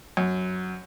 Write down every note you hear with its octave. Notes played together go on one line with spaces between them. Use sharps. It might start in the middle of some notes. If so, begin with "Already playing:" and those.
F#2